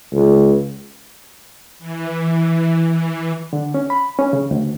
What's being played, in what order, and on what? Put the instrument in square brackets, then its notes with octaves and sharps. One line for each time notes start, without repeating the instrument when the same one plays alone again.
[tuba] C#2
[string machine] E3
E3
[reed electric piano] D3
C#4
B5
C#4
C#3
D2